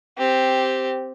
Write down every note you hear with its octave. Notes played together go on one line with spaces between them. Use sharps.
C4 G4